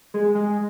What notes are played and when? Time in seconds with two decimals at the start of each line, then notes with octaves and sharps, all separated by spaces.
0.14 G#3
0.35 G#3